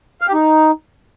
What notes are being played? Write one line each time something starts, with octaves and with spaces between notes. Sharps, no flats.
F5
G4
D#4